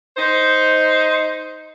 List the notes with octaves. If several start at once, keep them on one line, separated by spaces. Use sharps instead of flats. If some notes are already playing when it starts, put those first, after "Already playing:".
D#4 C5